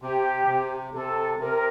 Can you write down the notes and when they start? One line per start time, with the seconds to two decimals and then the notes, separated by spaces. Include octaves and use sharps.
0.01 C3 G4
0.47 C3
0.93 C3 A4
1.39 C3 A#4